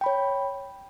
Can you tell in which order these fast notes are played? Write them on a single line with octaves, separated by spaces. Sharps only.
G5 B5 C#5